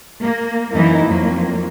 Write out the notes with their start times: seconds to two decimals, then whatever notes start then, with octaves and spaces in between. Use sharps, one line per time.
0.23 A#3
0.72 F#2 E3 A#3 D#4 E4
1.06 F2 F#3 A#3